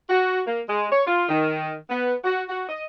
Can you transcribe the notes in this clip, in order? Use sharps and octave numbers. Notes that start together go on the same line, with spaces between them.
F#4
A#3
G#3
C#5
F4
D#3
B3
F#4
F#4
D#5